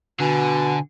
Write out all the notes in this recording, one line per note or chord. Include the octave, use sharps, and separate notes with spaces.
B2 D3 G#5